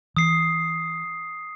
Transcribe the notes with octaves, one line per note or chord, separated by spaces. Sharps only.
E3 D#6 C7